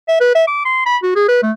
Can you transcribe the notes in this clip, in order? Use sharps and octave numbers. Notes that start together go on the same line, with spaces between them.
E5
B4
E5
D6
C6
B5
F#4
G#4
B4
A3